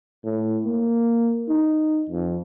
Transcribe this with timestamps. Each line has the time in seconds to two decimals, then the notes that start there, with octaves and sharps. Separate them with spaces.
0.24 A2
0.65 A#3
1.48 D#4
2.10 F2